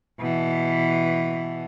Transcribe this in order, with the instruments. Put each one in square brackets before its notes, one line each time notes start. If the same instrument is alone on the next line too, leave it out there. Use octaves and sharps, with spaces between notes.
[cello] B2 E3